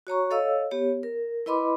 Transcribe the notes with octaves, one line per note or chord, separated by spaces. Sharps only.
F#4 C#5 A#5 C#6
A4 C#5 D#5 F5 E6
B3 G4 C#5
A#4
E4 B4 D#5 B5 C6 D6